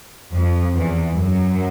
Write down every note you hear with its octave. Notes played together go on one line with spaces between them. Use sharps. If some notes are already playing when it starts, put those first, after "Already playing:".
F2 F3
E2 E3
F#2 F#3